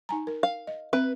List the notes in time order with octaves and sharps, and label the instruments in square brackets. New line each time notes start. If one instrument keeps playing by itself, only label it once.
[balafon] D#4 G#5 A#5
A#4
[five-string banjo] F5
[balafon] D#5
[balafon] C4 E5 [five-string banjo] B4